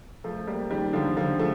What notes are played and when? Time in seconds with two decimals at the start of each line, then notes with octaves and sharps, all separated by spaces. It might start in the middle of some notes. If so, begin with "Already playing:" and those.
0.24 F3 A3
0.48 G3 A#3
0.71 D#3 G3
0.93 D3 F3
1.16 D3 F3
1.39 F3 A3